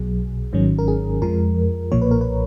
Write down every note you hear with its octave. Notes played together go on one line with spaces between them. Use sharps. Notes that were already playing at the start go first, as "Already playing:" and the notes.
Already playing: B1 B2 F#3 G#4
G#1 G#2 D#3 F#3 C#4
A#4
G#4
F2 F3 G#3 A#4
B1 A#2 F3 A#3 C#5
B4
A#4
B4